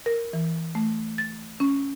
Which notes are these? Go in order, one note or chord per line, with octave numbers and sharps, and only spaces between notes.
A#4
E3
A3
A6
C#4